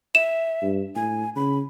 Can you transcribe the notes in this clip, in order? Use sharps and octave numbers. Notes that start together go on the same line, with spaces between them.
E5 E7
G2
A2 G#5
C#3 B5